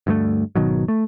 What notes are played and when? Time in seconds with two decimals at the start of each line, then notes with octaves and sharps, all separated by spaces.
0.07 D2 G2 G#3 A3
0.55 G#1 B2 D#3 F#3
0.88 A3